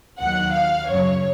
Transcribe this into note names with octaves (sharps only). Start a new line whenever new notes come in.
D#2 D#3 F#3 F#5
F5
F#2 C#3 F#3 C#5